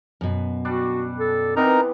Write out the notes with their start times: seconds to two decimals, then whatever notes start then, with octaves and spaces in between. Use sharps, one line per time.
0.21 F#2 B2
0.65 G3 D4 F#4 D5
1.19 A4
1.56 C3 E3 B3 C4 D#4 A#4 A#5